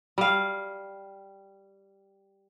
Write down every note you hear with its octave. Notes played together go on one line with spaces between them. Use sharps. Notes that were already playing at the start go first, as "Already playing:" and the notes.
G3 F5